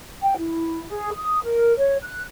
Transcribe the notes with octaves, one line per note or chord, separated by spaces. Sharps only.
G5
E4
G#4
D#6
A#4
C#5
F#6